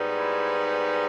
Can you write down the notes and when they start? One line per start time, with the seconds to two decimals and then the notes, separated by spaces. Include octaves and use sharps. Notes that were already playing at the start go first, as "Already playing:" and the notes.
Already playing: G#2 G3 B3 D#4
0.14 E4